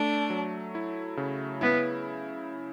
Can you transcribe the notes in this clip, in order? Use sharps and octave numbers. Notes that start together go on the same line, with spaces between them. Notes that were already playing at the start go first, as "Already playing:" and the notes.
Already playing: A3 D4
F#3
E4
C#3
B3 E4